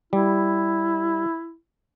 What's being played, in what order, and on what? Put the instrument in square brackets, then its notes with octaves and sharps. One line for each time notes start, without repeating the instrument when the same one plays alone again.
[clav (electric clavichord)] G3 [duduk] E4